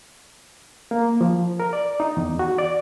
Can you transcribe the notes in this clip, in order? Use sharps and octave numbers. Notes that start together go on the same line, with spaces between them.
A#3
F3
A#4
D5
D#4
E2
F#4
D5